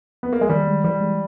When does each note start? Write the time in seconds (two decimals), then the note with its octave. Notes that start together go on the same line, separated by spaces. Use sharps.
0.23 B3
0.33 A#3
0.41 G#3
0.49 D#3 G3
0.67 G#3
0.84 E3 G3
1.01 G#3